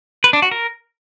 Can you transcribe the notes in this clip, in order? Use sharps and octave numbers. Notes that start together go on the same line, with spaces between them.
B4
D4
F#4
A#4